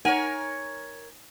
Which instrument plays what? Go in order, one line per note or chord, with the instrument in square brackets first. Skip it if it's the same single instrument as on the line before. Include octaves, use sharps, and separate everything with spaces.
[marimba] D#4 F#5 [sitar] A#4 C#5 [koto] G#5